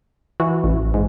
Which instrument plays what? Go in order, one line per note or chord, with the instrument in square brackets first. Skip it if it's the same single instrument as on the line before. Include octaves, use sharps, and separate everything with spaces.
[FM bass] E3 [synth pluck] F#4
[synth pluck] A1
[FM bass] G#2